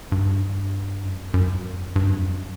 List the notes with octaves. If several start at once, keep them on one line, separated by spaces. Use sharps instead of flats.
G2
F#2
F#2
G2
F#2
F2
F#2